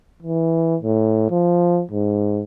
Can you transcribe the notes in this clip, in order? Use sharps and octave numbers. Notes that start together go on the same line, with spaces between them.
E3
A2
F3
G#2